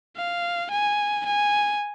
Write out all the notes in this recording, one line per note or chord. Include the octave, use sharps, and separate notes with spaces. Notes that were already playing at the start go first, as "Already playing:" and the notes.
F5
G#5
G#5